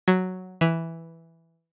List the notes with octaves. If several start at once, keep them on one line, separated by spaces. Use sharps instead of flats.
F#3
E3